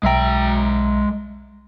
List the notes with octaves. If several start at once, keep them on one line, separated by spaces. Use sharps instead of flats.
B1 G#3 E5 G5 A#5